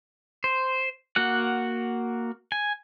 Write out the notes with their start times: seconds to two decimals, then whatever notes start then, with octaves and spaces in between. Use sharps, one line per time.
0.44 C5
1.16 A#3 F#4 F#5
2.52 G#5